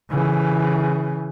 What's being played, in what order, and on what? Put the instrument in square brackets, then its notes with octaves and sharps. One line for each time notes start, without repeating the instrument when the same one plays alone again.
[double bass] C#3 E3